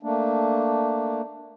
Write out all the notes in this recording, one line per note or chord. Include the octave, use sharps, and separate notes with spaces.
A3 A#3 D4